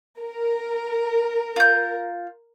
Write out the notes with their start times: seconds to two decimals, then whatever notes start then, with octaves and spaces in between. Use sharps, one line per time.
0.20 A#4
1.56 F4 G6